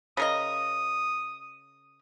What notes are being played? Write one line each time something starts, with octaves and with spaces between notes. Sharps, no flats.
C#3 A#4 D#5 D#6